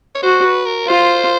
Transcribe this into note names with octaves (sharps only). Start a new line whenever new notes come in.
C#5
F#4 C5
B4
A#4
F4 C5